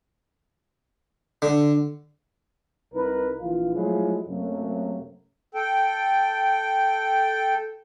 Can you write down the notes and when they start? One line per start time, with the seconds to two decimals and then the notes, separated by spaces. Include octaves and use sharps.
1.42 D3
2.94 C2 D#4 A#4 B4
3.40 A#1 E3 F4
3.75 F3 F#3 G#3 A3 E4
4.28 F#2 C3 F#3 A3 A#3
5.55 A4 G5